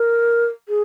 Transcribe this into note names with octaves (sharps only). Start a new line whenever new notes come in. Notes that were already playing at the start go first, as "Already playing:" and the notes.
Already playing: A#4
G#4